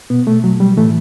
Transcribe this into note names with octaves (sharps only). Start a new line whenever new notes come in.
B2 B3
A3
F#3
G3
A2 E3 A3